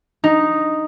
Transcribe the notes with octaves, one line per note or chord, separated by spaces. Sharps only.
D#4